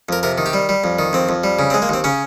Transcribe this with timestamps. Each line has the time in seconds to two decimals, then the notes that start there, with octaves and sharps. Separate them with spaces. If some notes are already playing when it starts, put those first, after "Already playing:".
0.09 F2 A#4
0.23 C3 A#4
0.38 D#3
0.46 G4
0.53 G3
0.69 G3
0.84 F2
0.99 D#3
1.13 F2 C4
1.29 F2
1.44 G3
1.59 C#3
1.70 C4
1.74 G#3
1.82 A#3
1.89 D#2 C4
2.04 C#3 C#4